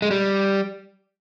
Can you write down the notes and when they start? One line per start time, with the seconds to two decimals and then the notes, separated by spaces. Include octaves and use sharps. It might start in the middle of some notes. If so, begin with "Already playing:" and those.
0.02 G#3
0.11 G3